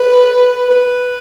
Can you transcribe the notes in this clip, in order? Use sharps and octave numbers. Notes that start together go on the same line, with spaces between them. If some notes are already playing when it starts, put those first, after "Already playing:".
Already playing: B4
B4